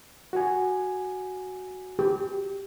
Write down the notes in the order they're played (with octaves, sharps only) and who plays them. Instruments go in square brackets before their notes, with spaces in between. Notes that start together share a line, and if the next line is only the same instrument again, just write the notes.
[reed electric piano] F#4 G#5
[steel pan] G4